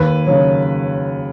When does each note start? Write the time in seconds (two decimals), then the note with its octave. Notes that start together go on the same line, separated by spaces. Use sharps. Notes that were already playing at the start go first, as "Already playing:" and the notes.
Already playing: D#2 B4
0.27 C#3 F#3